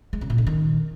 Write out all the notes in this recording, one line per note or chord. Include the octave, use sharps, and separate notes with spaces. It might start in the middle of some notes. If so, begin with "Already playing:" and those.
G#3
C#3
A#2
D3
D#3